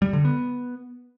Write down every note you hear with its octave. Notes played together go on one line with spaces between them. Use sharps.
G3
D3
B3